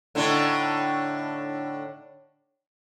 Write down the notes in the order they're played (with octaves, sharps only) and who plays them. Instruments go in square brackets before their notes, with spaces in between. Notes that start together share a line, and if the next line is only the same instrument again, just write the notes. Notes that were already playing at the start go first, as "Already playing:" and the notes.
[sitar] A2 D3 D#4